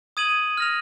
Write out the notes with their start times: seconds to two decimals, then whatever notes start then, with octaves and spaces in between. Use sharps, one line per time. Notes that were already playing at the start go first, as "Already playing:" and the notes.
0.17 D#6 G#6 D#7 F#7
0.57 F6 A#6 F7